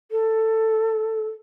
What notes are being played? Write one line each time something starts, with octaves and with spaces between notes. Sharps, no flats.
A4